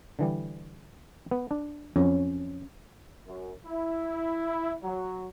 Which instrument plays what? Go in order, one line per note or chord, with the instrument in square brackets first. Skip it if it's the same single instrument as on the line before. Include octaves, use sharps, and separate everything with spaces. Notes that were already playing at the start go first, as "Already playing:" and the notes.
[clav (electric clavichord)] D3 E3 G3
B3
D4
[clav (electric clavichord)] F2 [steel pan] C#4
[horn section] F#2
E4
F#3